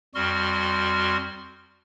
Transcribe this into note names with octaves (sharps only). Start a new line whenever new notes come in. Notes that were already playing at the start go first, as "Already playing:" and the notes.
F2 G3 F#4 C6 F6